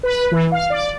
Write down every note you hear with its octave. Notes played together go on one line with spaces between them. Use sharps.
B4
E3
F5
D5